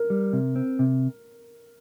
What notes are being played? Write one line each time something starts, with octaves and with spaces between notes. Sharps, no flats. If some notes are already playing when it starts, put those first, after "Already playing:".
Already playing: A#4
G3
C3
C4
C3